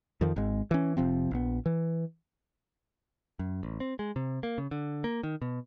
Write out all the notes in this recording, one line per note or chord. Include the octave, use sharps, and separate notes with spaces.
F2 D#3 F3
G#1 G#3
E3 C#4
F1 C3 F3 C4
A#1 B3
E3
F#2
A1
C4
G#3
C3
A#3
C#3
D3
A#3
D#3
B2